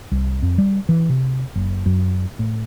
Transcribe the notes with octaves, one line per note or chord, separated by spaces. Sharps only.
C2
F2
G3
E3
C3
F#1
F#2
A2